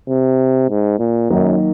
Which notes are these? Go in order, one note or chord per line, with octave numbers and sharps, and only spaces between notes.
C3
G#2
A#2
F#2 D#3 F#3 A#3 D#4